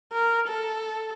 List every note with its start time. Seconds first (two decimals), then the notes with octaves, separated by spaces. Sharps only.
0.12 A#4
0.48 A4